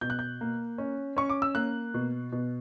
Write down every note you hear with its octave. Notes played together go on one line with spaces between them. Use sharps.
B2 G6
F#6
G6
A#3
C#4
C#4 C#6
D6
E6
A#3 F#6
B2
B2